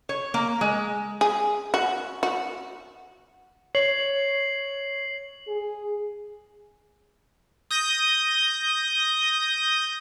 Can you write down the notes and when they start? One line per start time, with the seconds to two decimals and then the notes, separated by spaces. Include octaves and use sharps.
0.09 C#5
0.34 A#3
0.61 G#3
1.21 G#4
1.74 F#4
2.23 F#4
3.75 C#5 C7 F#7
5.48 G#4
7.71 D#6 G6 A#6